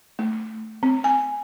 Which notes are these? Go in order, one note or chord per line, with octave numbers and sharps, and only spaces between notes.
A3
C4
G#5